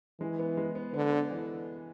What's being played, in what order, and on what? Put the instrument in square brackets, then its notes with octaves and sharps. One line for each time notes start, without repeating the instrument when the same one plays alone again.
[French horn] E3 [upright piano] G#3
[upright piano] B3
G#3
B3
[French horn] D3 [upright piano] B3
[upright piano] B3
E3